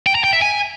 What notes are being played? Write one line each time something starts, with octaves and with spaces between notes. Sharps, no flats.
G5
A#5
G5
E5
G#5